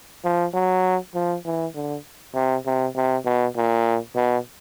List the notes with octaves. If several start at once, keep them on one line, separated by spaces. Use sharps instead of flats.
F3
F#3
F3
E3
D3
C3
C3
C3
B2
A#2
B2